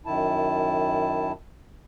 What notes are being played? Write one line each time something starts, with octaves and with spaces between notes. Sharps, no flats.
F#2 D#3 E4 A5